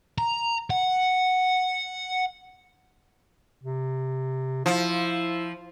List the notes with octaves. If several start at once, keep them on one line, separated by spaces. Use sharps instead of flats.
A#5
F#5
C3
F3 E4